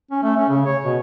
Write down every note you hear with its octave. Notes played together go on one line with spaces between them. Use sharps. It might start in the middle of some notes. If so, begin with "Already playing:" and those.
C#4
A3
C#4
C#3
C#5
B2